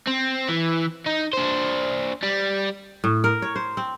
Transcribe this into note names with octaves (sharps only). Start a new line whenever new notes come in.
C4
E3
D#4
D4 C5
G3
A2
A#4
C#5
C5
C4